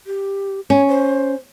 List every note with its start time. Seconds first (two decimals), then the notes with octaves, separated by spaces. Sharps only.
0.07 G4
0.70 C#4 C#5
0.89 C5